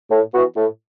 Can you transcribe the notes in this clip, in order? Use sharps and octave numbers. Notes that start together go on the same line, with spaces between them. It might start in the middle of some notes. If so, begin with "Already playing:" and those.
A2
E3 B3 F#4
A2